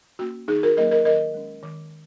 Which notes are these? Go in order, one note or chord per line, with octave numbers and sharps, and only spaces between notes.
A#3 C#4 F#4
D#3 D#4 G#4
F#4 A#4
F#3 A#3 C#4 A#4 D#5
A#4 D#5
D#3 A#4 D#5
G#3 C#4
D#3